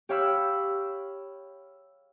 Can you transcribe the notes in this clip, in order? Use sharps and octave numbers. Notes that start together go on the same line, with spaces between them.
G4 C#5 F5 B5 E6